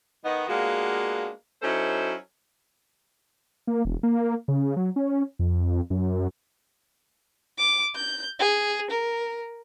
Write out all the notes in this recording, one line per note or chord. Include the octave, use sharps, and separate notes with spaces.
D#3 B3 D#4
G#3 A#3 B3 D4 F4 F#4
F#3 C#4 D#4 E4 A4 C5
A#3
E1
A#3
C#3
F#3
C#4
F2
F#2
D6
G6
G#4
A#4